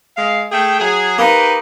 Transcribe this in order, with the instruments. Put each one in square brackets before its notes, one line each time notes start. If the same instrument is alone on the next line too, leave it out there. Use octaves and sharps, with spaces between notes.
[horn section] G#3 F5
A3 G#4 G5
F#3 G#4
[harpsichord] A#3 [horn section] D#4 G4 B4